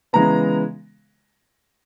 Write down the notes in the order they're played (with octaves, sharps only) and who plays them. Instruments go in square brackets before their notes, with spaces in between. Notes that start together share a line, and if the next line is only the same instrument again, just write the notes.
[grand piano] C#3 E3 G#3 B3 A#5